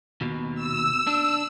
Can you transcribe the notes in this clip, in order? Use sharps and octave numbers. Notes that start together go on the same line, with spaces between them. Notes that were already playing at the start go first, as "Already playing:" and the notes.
D#2 B2
E6
D4